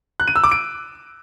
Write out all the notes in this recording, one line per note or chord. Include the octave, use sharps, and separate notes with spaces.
F#6
D#7
E6
D6
D7